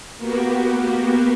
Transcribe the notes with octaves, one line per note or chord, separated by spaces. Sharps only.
A#3 B3 F#4 G4